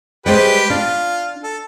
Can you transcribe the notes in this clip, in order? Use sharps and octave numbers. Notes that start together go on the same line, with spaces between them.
G3 G#3 G4 B4 C5 G5
D4 F4
A4